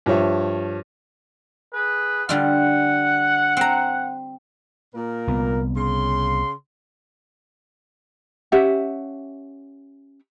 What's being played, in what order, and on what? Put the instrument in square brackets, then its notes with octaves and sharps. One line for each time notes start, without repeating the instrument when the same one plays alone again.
[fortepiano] G2 F3 C#5 E5
[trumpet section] G#4 B4
[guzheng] D3 G3 F4 [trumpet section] F#5
[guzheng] C4 A#5
[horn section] A#2 A#3 A#4
[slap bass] C2 B3
[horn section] C#3 C6
[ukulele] C#4 G4 E5 F#5